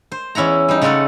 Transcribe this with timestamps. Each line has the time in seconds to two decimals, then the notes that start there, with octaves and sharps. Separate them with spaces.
0.12 C5
0.35 E2 C#4 E4 F#5 A#5
0.69 G3 D#4
0.82 C#3 G#3 A3 C#4 A4 F#5